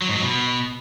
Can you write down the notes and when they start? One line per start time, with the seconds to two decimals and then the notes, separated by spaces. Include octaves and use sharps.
0.02 F#3
0.09 G#2
0.16 F#3
0.23 B2